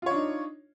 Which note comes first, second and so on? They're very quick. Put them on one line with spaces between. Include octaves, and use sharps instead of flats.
F4 C#5 D4 D#4